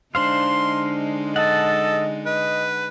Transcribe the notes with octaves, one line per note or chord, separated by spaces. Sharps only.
D3 G#3 D4 D#4 C5 F5 C6
A4 D#5 F#5 A5
B4 D#5